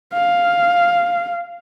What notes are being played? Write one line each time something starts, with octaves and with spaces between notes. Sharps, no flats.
F5